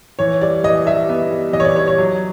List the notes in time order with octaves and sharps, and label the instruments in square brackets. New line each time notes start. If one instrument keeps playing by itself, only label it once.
[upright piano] E3 C#5
G3 D5
E3 D#5
G3 E5
B3
G3
E3 D#5
C#5
D5
G3 C#5
C#5
F#3